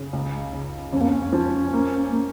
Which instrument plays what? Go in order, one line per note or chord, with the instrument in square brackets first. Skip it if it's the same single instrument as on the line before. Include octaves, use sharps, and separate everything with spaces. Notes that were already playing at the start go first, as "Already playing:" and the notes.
Already playing: [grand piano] C#3
C#2
C#3
[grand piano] F2 [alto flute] C#4
[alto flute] A#3
C#4
[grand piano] F3
A#3
A#3